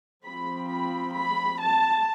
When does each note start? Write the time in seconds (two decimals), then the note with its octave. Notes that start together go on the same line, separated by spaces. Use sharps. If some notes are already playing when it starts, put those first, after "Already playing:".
0.24 F3 C4 B5
0.69 B5
1.14 B5
1.59 A5